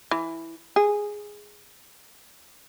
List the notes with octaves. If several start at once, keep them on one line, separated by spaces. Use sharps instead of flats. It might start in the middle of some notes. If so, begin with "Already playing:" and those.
E3
G#4